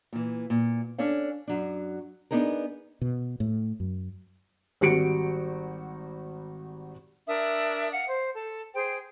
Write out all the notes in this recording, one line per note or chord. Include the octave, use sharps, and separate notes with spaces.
A#2 E3
A#2
C#4 D4 A4 C#5 F5
F#2 F#3 D4
B3 D4 D#4 G#4 A#4
B2
A2
F#2
G#1 G3 F#4 C#7 D7
D4 A#4 E5 D#6
F5 F#5
C5
A4
G#4 C5 G5